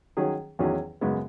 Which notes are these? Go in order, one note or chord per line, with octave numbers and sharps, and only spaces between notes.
D#3 F#3 C#4 G#4
E2 D#3 F#3 C#4 G#4
F#2 C#3 G#3 B3